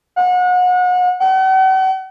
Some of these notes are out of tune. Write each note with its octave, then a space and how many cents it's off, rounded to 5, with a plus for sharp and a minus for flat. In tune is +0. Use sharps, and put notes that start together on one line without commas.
F#5 -35
F#5 +45